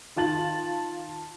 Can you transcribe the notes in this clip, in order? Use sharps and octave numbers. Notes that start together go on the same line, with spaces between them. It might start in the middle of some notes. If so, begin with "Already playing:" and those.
D#3 F4 A5 A6 F#7